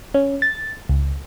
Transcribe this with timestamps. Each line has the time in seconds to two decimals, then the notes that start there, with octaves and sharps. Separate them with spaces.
0.14 C#4
0.42 A6
0.89 C#2